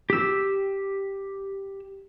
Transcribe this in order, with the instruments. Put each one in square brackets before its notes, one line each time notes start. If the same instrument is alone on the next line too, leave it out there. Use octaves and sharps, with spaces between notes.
[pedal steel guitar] G4 E6